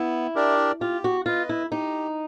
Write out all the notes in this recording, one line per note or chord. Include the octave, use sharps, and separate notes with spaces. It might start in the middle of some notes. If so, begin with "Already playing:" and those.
Already playing: B3 E4
D4 G4 A#4 D5
F4 G4
F#4
F4 B4 D#5
E4
D#4 G4